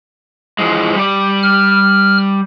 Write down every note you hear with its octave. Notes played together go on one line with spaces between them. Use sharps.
E3 F3 G#3
G3 D5
F6